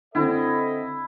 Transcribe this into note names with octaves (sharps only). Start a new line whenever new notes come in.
D3 C4 E4 A4 D#5